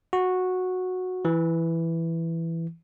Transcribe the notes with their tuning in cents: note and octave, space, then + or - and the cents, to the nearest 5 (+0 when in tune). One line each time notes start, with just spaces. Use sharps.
F#4 -10
E3 +5